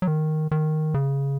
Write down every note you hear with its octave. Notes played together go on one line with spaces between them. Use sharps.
F#3
D#3
D#3
C#3